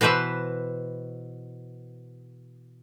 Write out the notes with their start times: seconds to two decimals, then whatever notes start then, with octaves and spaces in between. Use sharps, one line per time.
0.01 B2 E3 B4 C5 E5